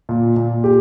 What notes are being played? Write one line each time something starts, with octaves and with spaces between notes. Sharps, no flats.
A#2
A#2
G4